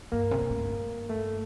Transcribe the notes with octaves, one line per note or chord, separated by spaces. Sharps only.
G2 A#3
C3
A#2
A2
G2
A3